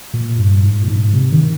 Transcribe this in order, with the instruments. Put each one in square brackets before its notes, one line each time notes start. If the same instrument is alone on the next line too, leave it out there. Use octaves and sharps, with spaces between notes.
[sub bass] A#2
G2
G#2
A#2
G#2
C3
D#3